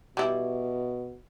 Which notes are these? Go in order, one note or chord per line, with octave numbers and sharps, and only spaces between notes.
B2 G3 E4